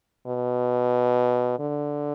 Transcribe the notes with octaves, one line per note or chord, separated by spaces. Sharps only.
B2
D3